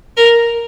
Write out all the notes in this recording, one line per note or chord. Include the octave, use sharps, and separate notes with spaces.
A#4